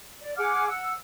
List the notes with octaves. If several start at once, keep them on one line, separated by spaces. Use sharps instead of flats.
D5
G#4 F#5 D6 F6
F#5 E6